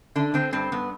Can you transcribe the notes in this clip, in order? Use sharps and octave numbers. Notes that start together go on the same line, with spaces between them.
D3 D4
D3 C4
G2 C4
G2 B3